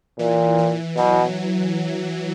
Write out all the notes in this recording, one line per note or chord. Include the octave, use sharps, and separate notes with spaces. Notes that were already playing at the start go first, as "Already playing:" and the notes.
A#2 E3
E3
B2 F#3